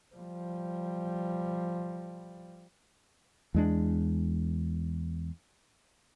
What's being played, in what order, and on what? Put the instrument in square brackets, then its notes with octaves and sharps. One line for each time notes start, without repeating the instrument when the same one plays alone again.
[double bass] F3 G3
[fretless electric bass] E2 G#3 D4